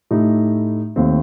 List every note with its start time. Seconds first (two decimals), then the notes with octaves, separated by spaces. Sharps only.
0.11 A2 A3 D#4 G4
0.96 D#2 D#3 A3 C4